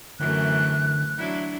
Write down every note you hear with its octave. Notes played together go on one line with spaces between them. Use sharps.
F#2 D3 E3 A3 F#6
F#3 D4 E4